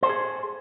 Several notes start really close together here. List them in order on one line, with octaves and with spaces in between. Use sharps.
C5 A4 G#4